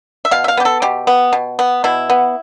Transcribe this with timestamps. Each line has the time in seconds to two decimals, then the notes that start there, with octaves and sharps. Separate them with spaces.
0.25 E5
0.31 B2 F5
0.44 E5
0.48 F5
0.57 B3 G4
0.65 A4
0.82 B2 G4
1.07 B3
1.33 B2
1.59 B3
1.84 B2 E4
2.10 B3